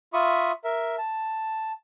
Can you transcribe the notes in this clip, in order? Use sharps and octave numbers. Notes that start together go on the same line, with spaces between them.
F4 E5 B5 C#6 D#6
A#4 E5
A5